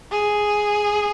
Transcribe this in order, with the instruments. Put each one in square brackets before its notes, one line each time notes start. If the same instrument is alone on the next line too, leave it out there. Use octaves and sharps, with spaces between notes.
[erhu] G#4